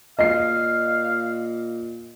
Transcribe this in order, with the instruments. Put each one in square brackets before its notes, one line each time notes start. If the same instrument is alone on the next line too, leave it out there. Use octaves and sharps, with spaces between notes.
[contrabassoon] A#2 [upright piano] D#5 C7 [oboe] F5